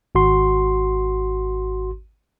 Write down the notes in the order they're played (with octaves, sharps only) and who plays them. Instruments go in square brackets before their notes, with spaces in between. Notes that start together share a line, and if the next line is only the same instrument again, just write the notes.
[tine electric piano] G#1 F#4 C6